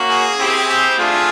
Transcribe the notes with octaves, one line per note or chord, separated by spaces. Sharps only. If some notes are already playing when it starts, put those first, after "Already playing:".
Already playing: A#3 C#4 F#4
G#4
C4 E4 G4
G4
A3 D4 F4 G#4